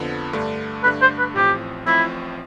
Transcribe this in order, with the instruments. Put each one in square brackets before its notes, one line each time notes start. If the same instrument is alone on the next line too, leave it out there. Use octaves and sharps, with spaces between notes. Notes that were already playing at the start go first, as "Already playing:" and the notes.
Already playing: [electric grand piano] F2 D3 F3 B3
G2 D3 A3 D4
[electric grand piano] G2 D3 A3 D4 [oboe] B4
[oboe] C5
B4
[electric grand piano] A1 A2 F3 C4 [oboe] G4
[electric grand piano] A1 A2 F3 C4 [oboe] E4